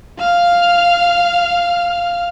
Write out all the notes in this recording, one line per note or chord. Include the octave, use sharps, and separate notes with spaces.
F5 F6